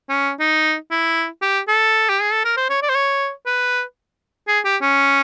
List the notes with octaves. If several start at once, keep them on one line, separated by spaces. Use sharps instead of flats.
C#4
D#4
E4
G4
A4
G4
G#4
A4
A#4
C5
C#5
D5
C5
C#5
B4
G#4
G4
C#4